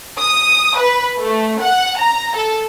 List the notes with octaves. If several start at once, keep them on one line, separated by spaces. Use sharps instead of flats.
D#6
B4
A3
F#5
A#5
A4